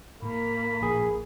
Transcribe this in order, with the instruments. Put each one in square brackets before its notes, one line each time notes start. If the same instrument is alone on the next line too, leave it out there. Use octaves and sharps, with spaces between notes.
[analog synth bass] A2 [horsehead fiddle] A#3 [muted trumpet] B5
[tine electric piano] A#1 G#4